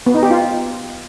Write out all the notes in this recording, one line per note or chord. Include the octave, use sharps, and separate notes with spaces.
B3
D#4
G4
F4